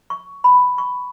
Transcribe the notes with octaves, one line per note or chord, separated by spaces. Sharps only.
C#6
B5
C#6